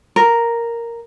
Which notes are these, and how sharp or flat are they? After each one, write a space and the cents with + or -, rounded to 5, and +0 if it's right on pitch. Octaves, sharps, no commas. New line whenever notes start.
A#4 +0